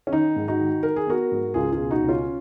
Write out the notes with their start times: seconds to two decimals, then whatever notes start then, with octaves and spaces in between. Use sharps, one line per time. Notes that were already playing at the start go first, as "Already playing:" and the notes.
0.07 C#4
0.12 D#3 D#4
0.36 G#2
0.48 D#4 F#4
0.59 D#3
0.83 D#3 A#4
0.96 G#4
1.07 B3 F#4 A#4
1.32 G#2
1.54 C#2 F4 G#4
1.72 F4 G#4
1.78 B2
1.91 D#4 F#4
2.03 C#2
2.08 C#4 F4